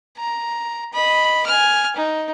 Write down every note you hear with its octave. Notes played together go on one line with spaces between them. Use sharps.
A#5
D#5 B5
G#5 F6
D#4